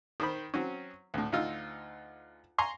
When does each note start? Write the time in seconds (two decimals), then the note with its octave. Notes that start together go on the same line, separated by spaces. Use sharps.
0.20 D#3 C5 B5
0.54 F#3 C4 C#4
1.14 D2 A2
1.32 D2 D#4 F4 E6
2.58 G#5 A#5 C6 C#6